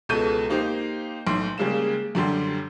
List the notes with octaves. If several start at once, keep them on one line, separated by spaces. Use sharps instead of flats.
C#2 B2 A4 G6 D#7
A#3 D#4 G4 C5
B1 A2 C6
C#3 G3 G#3 A#3 E7
F#2 D3 G3 G4 C6